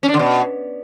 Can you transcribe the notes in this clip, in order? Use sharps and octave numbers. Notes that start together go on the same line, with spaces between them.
C#4
D4
D3
B2